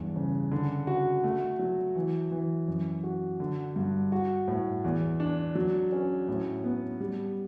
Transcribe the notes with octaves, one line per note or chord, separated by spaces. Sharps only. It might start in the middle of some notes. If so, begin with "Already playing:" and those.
Already playing: E2 G2
C#3
D3
F#4
A3
F#3
E3
E3
F#2
F#4
D3
G2
F#4
A2
E2
D4
F#3
C#4
A2
B3
G3